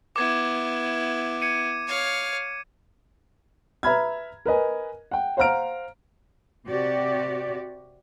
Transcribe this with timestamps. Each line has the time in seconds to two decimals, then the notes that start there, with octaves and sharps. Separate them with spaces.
0.16 B3 E4 D6 G#6
1.42 G#6 C#7 D#7
1.87 C#5 F5
3.83 B4 E5 A#5 B5 F6 G#6
4.46 A#4 B4 D#5 G#5
5.11 F#5 G5
5.37 C5 F5 F#5 A#5 F6 D7
6.67 C3 F#4 G4 D5